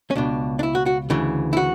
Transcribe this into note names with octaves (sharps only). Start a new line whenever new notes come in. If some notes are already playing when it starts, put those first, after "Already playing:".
C#4
C#2 B2 D4
D4
E4
F#4
F#4
D2 C#3 E3
E4
F#4